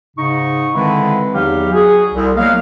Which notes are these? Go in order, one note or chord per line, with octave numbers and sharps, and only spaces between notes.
G#2 C#3 D#4 C#6
D3 D#3 G#3 C4 E4 B4
E2 F#3 D#4 G4 F5
F#4 G#4
C2
F#3 A#3 B3 D#5 F5